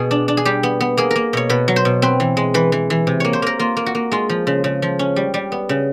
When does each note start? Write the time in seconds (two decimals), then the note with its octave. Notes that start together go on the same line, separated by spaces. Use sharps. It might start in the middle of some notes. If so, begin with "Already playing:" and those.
Already playing: B2 G#4
0.11 D4
0.28 D4
0.37 G#4
0.45 G3 G4
0.63 B3
0.80 B3
0.97 A#3 G#4
1.11 A#3 A#4
1.33 B2 C#5
1.49 B2 B4
1.68 F#3
1.76 C5
1.85 B2
2.02 C4 B4
2.20 E3
2.37 G#3
2.54 E3 B4
2.72 E3
2.90 E3
3.07 C3
3.20 A#3 C#5
3.33 C5
3.42 A#3 A#4
3.59 A#3 F4
3.77 A#3
3.86 F#4
3.95 A#3
4.12 G#3 F4
4.29 F3
4.47 C#3
4.64 C#3
4.82 F3
4.99 C#4
5.16 G3
5.34 G3
5.52 B3
5.69 C#3